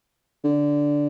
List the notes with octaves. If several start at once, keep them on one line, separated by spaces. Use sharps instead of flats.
D3